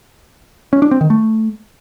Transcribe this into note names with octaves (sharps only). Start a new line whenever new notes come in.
C#4
D4
C4
D#3
A3